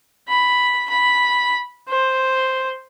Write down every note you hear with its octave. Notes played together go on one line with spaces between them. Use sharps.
B5
B5
C5